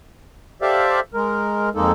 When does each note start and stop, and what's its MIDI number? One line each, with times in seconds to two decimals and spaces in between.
0.62 1.00 67
0.62 1.00 69
0.62 1.00 72
0.62 1.00 74
0.62 1.00 76
0.62 1.00 77
1.14 1.69 56
1.14 1.69 70
1.75 1.92 41
1.75 1.92 56
1.75 1.92 58
1.75 1.92 63
1.75 1.92 69